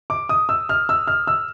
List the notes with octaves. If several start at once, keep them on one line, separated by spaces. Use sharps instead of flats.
D6
D#6
E6
F6
E6
F6
E6